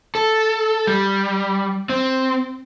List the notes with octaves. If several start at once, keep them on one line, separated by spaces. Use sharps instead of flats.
A4
G3
C4